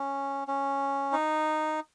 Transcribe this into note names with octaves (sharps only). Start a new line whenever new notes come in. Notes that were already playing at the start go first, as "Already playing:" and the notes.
Already playing: C#4
C#4
D#4